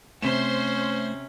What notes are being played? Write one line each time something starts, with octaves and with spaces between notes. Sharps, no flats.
C3 A3 C#4 C5 B6 E7